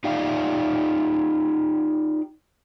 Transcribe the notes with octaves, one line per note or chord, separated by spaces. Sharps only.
D#4 F4 G4 D5 F5